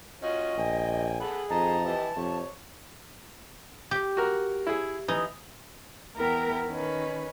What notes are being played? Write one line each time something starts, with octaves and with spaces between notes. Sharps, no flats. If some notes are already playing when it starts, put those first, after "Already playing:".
C#4 F4 F#4 D#5
A#1 G5 G#5
G#4 A4 F#5 B5
F2 D#5 A5 A#5
E3 G4 D#5
F2 C3 C#5
G4
F#4 A#4
E4 G#4
E3 D#4 D#6
E2 B3 E4 A#4 G5 A#5
D#3 C#4 B4